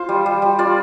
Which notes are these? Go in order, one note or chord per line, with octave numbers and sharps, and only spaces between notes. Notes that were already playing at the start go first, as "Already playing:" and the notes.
Already playing: F4 C5
G3
G3
G3
F4 D5